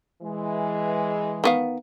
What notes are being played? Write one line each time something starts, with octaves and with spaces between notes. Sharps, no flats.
E3 G#3
D#3 B3 F5